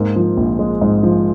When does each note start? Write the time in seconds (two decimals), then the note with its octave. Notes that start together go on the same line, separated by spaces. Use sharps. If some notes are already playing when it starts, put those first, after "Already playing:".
Already playing: G#2 A#3
0.16 F3
0.37 A#1
0.59 G#3
0.81 G#2
1.03 F3